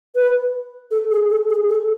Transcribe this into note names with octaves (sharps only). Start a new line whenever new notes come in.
B4
A4
G#4
A4
G#4
A4